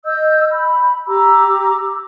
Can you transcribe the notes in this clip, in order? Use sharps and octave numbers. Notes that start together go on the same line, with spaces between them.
D#5 E6 G6
B5
G4 A#5 D6 E6